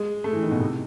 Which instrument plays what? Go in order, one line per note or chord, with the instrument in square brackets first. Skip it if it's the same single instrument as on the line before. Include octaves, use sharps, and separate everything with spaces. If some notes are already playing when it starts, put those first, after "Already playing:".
Already playing: [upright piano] G#3
A3
E3
D#3
B2
C3